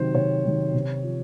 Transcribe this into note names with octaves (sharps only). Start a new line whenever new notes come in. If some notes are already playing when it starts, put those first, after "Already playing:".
Already playing: C3 D#3 F#3 C5
C3 C#5
D#3 F#3
C3
F3